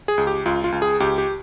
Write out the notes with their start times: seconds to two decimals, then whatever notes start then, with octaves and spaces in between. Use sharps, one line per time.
0.08 G#4
0.18 C#2
0.27 G4
0.46 C#2 F4
0.64 F4
0.72 C#2
0.82 G#4
1.00 C#2 G4
1.18 G4